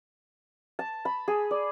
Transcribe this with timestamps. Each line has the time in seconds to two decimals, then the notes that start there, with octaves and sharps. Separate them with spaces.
0.79 A5
1.05 B5
1.28 G#4
1.51 D5